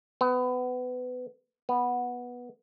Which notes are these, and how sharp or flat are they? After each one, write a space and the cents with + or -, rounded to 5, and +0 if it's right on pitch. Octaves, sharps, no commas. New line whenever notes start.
B3 +25
B3 -10